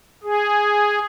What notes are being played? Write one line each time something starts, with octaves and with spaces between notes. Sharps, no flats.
G#4